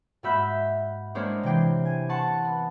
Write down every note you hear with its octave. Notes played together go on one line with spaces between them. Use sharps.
G#2 A#3 F#4 E5 B5 G6
G#3 A#3 D4 C5 C#5
C3 E3 G5 C7
G#5
F#5 A5 C6 C#6
B3